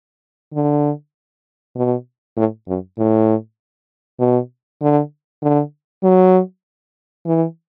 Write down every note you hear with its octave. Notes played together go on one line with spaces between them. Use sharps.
D3
B2
A2
F#2
A2
B2
D3
D3
F#3
E3